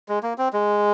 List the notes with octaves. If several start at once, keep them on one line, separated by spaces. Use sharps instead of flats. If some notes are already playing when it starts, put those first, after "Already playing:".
G#3
A#3
C4
G#3